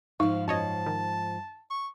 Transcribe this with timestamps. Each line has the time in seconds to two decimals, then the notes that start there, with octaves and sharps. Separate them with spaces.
0.20 G#2 F3 D#4 F5
0.48 F#2 C#5 D#5 A5
0.86 D#3
1.70 C#6